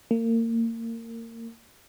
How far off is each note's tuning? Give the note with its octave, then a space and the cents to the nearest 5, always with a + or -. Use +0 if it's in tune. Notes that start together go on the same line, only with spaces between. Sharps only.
A#3 -30